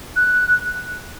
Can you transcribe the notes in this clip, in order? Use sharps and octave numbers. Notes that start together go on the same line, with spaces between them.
F#6